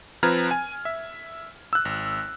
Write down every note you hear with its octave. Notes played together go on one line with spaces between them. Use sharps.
F3 C4 B4 A#5 F6 G#6
G#5
E5
E6 F#6
G#1